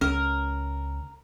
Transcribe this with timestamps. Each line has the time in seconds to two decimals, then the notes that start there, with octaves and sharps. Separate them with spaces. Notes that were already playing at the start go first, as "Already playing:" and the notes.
0.01 C#2 C#4 A#4